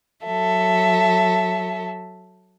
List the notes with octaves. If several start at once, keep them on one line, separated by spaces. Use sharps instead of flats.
F#3 A4 E5